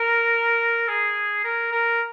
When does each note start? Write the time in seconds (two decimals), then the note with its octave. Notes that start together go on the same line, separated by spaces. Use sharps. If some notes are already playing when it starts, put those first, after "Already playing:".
Already playing: A#4
0.88 G#4
1.44 A#4
1.72 A#4